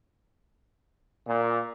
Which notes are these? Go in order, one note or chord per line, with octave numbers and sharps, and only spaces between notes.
A#2